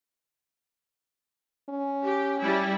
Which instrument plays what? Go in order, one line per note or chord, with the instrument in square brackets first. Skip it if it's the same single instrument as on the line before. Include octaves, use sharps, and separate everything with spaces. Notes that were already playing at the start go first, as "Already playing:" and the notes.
[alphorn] C#4
[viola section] G4
G3 E4